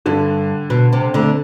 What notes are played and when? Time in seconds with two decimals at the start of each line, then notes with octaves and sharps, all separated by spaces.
0.06 G2 D3
0.70 B2
0.93 C3
1.14 D2 D3